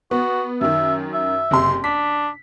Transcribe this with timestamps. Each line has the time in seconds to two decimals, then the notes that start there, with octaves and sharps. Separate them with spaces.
0.11 B3 F#4
0.61 F#2 D#3 E5
1.13 E5
1.51 F#1 C3 C6
1.84 D4 B6